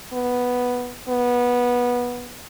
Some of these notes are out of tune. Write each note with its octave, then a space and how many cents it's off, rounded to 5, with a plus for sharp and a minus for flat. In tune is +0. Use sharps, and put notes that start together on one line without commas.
B3 -5
B3 -15